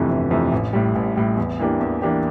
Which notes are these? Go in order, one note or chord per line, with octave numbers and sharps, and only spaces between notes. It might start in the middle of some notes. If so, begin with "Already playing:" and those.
Already playing: G1 F2 C3 E3 A3
G1
F2 C3 E3 A3
A1
A2 G3
A1
A2 G3
E2
E3 A#3 D4 G4
E2
E3 A#3 D4 G4